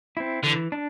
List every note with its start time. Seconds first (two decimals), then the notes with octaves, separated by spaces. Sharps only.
0.17 C4 E4
0.44 D3 E3
0.72 D4